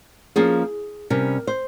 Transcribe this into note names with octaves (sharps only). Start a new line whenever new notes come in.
F3 A#3 C#4 G#4
C3 G3 C#4 A#4
C5